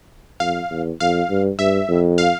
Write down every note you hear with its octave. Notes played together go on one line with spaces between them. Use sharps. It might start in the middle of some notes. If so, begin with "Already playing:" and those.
F2 F5
E2
F2 F5
G2
G2 E5
F2
F5